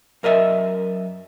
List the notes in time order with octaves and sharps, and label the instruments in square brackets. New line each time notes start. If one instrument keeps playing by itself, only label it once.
[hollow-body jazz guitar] F#2 A#4 D#5 E5